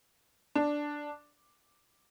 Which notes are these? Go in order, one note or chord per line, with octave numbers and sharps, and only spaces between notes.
D4